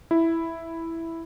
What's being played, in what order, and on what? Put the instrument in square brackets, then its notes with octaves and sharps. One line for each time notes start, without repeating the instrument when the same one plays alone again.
[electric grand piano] E4